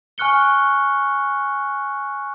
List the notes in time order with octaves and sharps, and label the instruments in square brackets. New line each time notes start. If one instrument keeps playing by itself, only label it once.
[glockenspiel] G#5 C#6 F6 F#6 C#7 G7